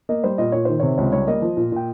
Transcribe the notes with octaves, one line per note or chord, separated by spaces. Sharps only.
A#3 D#5
G3 C5
A#2 D#5
A#2 C#5
D#3 C5
C3 C#5
C#2 C#5
G3 C#5
A#3 D#5
F3
A#2
A#2 G5